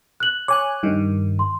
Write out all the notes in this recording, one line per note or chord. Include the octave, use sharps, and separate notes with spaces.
F#6 F#7
C#5 G#5 D6 F#6
G2 D#3
C6